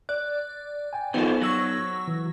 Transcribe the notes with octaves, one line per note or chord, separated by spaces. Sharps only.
D5 F#6
G5 G#5
D#3 F3 B3 D#4 F#4 A4 C5
F#3 C#6 E6 A#6
E3